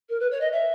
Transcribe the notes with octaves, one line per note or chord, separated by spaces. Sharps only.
A#4
B4
C#5
D#5
E5